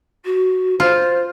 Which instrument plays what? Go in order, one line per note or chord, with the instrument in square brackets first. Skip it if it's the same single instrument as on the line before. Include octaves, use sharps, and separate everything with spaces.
[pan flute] F#4
[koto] F4 [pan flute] C5